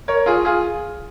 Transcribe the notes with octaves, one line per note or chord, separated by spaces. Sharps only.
A#4 C#5
F4 G#4
F4 G#4